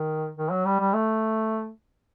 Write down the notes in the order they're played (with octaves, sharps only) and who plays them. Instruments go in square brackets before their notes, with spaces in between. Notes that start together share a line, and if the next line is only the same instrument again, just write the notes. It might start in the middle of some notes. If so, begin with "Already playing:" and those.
Already playing: [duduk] D#3
D#3
F#3
G3
G3
A3